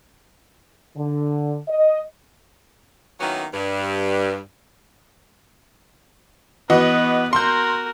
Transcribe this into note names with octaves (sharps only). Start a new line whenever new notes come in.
D3
D#5
D#3 F#3 A#3 B3 C#4 E4
G2
E3 B3 F#4 B4 D#5
F#4 A#4 C6 G6